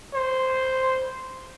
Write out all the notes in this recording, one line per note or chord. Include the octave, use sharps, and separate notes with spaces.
C5